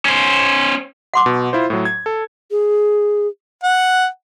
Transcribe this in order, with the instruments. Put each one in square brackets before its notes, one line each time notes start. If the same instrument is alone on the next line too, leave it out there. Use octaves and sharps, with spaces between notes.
[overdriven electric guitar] C#4 C5
[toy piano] F#5 C6 D6
[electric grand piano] B2
E4 F4 C5
A2 F#3
G#6
A4
[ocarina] G#4
[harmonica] F#5